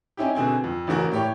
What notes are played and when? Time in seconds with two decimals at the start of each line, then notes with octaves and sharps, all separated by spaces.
0.17 C4 C#4 D#4 E4 G4
0.35 B2 D3 C4 G#4
0.64 F2
0.87 A1 E2 C#3 F#4 A#4
1.12 A2 G4 C#5